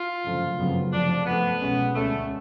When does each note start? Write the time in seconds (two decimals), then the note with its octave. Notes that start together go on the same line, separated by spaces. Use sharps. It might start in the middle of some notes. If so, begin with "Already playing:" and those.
Already playing: F4
0.24 F#1 F2 D3 F3 A3
0.58 F#1 F2 C#3 F#3 B3
0.92 F1 F2 F3 D4
1.26 F2 F3 A3 B3
1.61 B1 B2 G#3 C#4
1.95 D2 D3 G#3 A3 C#4